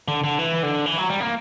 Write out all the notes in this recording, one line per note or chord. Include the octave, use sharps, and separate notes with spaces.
D3
D3
E3
D3
E3
F#3
G3
A#3